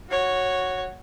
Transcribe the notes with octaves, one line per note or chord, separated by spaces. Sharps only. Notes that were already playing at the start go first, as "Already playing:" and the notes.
F#4 C#5